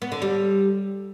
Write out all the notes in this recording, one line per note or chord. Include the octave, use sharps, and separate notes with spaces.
B3
D3
G3